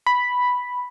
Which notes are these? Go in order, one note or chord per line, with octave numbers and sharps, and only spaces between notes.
B5